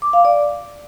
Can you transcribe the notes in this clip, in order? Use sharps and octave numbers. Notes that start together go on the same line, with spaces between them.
D6
F5
D5